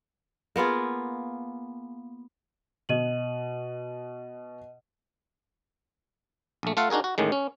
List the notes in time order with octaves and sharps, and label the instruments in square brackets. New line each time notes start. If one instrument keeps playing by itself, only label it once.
[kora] A#3 B3 F4 G#4
[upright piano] B2 F#4 [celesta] D#5 D#7 F#7
[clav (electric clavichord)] A#1 A3
A3 F4 A4 F5 F#5
D4 D#4 F#4 G#4 A#4
F#4
A1 A2 D#3 G#3
C#4